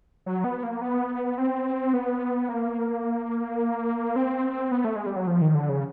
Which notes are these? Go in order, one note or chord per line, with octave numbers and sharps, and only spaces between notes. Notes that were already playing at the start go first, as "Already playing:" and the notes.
F#3
B3
A#3
B3
C4
B3
A#3
C4
B3
A3
G#3
G3
F#3
F3
D#3
D3
C#3